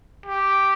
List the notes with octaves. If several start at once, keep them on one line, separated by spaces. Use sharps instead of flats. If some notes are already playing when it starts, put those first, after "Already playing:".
G4